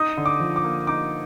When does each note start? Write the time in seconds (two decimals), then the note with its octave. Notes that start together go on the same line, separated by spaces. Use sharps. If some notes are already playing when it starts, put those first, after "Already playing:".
Already playing: D#4 D#6
0.17 D3
0.26 D6
0.40 F3
0.56 D6
0.64 A#3
0.87 D#4 D6